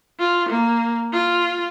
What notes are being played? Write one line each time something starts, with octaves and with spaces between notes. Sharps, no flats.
F4
A#3
F4